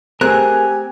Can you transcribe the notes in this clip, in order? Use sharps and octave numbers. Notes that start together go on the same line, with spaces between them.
A3 C4 G4 G#4 A#4 G#5 F#6